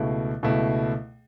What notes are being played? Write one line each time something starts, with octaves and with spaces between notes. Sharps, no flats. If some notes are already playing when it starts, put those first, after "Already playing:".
Already playing: C#2 B2 A3 E4
C#2 B2 A3 E4